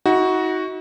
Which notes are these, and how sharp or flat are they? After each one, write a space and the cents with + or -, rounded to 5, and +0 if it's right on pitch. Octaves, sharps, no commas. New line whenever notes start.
D#4 +45 F#4 +0